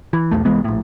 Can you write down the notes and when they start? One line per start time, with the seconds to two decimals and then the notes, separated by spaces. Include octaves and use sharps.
0.13 E3
0.31 B1 E2 A3
0.45 C2 E3 G#3 B3
0.64 A#1 A2